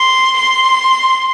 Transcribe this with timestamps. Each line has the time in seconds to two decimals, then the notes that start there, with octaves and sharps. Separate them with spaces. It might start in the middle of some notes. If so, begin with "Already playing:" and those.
Already playing: C6
0.38 C6